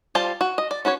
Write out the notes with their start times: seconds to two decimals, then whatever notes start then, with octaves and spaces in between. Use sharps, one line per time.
0.15 G3 F4 C5 G5 A5
0.41 F#4
0.58 D#5
0.71 D5
0.85 C#4 F#4 B4 C#5